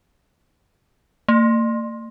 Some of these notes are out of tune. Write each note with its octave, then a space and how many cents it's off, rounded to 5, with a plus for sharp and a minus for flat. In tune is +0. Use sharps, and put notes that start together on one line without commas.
A#3 -45